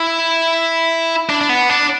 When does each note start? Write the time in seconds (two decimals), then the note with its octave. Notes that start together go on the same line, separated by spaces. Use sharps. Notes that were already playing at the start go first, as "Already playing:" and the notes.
Already playing: E4
1.30 D4
1.41 D4
1.49 B3
1.70 D4